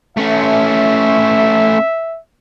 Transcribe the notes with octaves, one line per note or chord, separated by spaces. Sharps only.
A3 C#4 E5